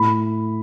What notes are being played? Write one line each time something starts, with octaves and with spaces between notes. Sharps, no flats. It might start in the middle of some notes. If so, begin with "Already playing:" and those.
Already playing: A2 B5